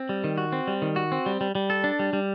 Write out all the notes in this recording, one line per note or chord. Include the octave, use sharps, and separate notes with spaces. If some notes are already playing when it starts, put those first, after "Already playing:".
Already playing: C4
G3
D#3
F#4
C4
G3
D#3
F#4
C4
G3
G3
G3
A4
D4
G3
G3